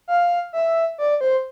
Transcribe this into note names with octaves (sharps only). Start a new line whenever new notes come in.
F5
E5
D5
C5